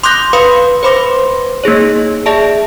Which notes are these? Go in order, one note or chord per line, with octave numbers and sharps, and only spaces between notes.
C6 D6 D#6 F#6 G6 A#6
B4 F5 B5 C6 D#6
B4 C5 B5 C6 D6 A#6
A#3 D#4 G#4 C#5
G#4 D5 E5 A5